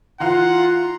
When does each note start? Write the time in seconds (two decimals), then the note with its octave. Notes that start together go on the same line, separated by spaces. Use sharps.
0.20 E3 F4 F5 F#5 A#5 C6